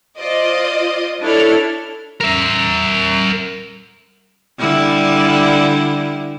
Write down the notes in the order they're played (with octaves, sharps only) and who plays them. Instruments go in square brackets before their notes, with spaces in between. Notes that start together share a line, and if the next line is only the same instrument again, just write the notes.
[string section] F4 C5 D5 D#5
D4 E4 A4 C#5 D5 F6
[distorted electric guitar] A#4 E5
[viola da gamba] D3 G3 E4